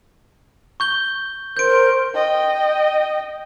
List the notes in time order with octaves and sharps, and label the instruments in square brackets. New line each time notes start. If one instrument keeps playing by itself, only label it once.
[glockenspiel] C#6 G6 G7
[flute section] A#4 C5 C6 [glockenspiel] G6 D7
[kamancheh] D#5 G5